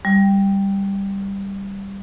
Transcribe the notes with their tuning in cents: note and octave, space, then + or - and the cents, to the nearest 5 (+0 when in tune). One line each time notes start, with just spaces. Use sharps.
G3 +5